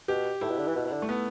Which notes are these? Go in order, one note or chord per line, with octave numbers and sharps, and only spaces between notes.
B2 G4
A2 E4
B2
D3
E3
B2
B2
D3
A3
B3